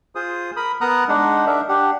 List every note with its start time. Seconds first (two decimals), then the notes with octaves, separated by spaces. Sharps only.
0.15 F4 G#4 C5 D#6
0.56 A#4 B5 D#6
0.81 B3 A#4 F#5 A#5 D#6 F#6
1.08 G#3 D4 D#4 F#5
1.47 D4 D#4 A#4 E5
1.69 D4 G4 F#5